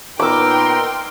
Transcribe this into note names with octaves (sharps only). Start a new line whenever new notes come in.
A#2 B3 D#4 A#4 G5 C6 D6 E6